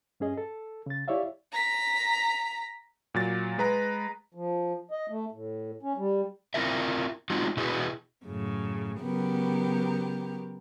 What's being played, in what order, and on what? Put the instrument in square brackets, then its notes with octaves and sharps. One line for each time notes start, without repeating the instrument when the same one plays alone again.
[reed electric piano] G2 C#4 G#4 D#5
A4
C#3 A6
E4 G4 C#5 D5 E5 F5
[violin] A#5 B6
[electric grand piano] A#2 F#3 A6
G#3 B4 A#5
[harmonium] F3
D#5
A3
A2
C#4
G3
[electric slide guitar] C4 E4 F4 A#4 E5
G#3 C4 D#4 F4 F#4
B2 E4 F#4 G#4 B4
[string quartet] F#2 A2 C#3
C#3 F#3 B3 G4 A#4